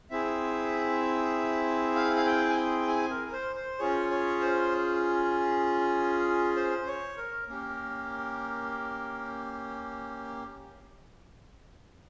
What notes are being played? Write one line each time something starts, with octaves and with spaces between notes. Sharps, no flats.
C4 E4 G#4 E5
F5
F5
G5
G#5
G5
G#5
A#4
A#4
C5
C5
C#4 F4 G#4 C#5
C#5
C5
C5
C#5
A#4
A#3 C#4 G4 A#4